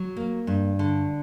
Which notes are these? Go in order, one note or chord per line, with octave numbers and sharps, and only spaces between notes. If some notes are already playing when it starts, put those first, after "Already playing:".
Already playing: F#3
A#3
G2
D3